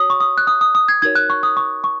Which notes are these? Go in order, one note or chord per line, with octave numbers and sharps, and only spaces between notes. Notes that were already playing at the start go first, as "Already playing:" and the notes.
Already playing: F#4 C#5 D#6
C#6
D#6
F#6
D#6
D#6
D#6
G#6
D#4 F#4 A#4 C#5 G#6
F#6
C#6
D#6
C#6
C#6